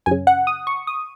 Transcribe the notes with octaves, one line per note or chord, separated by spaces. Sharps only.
F#2 C#3 G#5
F#5
D#6
C#6
D#6